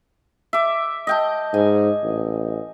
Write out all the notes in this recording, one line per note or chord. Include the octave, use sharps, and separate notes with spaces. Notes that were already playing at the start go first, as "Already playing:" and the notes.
E5 D6
D#5 G5 A5
G#2 G#5
A1